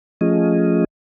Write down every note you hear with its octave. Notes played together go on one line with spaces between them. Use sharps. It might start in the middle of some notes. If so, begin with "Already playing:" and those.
F3 A3 C#4 F4 G#4 D#5